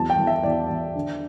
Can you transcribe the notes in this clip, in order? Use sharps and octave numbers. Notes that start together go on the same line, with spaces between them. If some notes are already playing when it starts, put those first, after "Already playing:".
Already playing: E2 F#3 C4 A5
G5
E2
E5
E2 D5
E2
D3